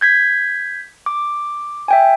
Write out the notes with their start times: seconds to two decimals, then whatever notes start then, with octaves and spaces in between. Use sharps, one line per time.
0.01 G6 G#6 B6
1.06 D6
1.88 E5 G5 G#5